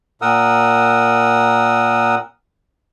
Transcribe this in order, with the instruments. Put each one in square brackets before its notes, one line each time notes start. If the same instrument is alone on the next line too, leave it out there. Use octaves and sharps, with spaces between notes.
[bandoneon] A#2 A#4 F#5 D#6 E6